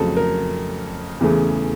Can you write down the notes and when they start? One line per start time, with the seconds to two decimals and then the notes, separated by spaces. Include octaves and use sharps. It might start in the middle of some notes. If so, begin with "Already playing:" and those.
Already playing: F2 C#3 F#3 A3 A4
0.17 A#4
1.21 E2 C#3 E3 A3